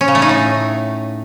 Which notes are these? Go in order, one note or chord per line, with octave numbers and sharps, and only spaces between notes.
C#4
C#3
A3
D#4
A2